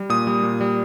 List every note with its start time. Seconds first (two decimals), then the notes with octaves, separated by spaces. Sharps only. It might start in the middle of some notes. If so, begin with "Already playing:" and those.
Already playing: G3
0.09 A#2 D#6
0.27 G3
0.43 A#2
0.61 G3